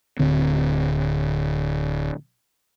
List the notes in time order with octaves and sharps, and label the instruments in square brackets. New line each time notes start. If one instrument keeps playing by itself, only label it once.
[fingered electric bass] D1 D3 C4